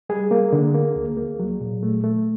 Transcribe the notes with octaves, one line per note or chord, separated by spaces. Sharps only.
G3 G#4
A#3
D3
A#3
D2
A#3
F#3
A#2
A3
A3